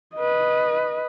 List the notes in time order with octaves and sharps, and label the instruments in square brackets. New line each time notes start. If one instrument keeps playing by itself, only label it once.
[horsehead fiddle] B4 D#5